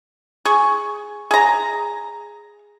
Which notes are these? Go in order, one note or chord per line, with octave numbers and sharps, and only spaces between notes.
G#4 C#6
G#4 A#5